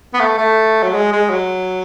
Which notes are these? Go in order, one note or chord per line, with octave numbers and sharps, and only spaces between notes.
B3
A3
A3
F#3
G#3
G#3
F#3